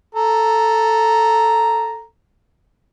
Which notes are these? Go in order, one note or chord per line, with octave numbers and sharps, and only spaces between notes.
A4 A#5